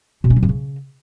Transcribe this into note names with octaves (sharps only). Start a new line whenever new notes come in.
B2
C#4
F#3
B2
C#3